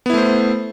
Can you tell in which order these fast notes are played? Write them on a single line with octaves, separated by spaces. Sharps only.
B3 E4 A3 C5